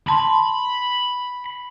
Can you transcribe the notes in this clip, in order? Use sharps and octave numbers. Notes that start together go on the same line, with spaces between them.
A5 B5 C6